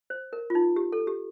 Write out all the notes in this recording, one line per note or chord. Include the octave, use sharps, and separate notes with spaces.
C5
A#4
F4
D#4
G4
A4
G4